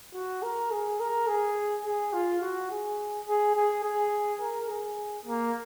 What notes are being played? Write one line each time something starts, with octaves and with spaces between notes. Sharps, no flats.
F#4
A#4
G#4
A#4
G#4
G#4
F4
F#4
G#4
G#4
G#4
G#4
A#4
G#4
A#3